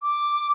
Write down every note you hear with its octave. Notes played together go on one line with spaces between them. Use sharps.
D6